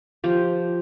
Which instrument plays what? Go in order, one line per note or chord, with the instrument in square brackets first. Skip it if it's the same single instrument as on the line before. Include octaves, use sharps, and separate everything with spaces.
[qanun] F3 G4